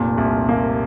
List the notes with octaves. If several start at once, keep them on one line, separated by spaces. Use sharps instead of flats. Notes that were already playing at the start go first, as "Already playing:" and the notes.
Already playing: F1 A#2
C2
A#3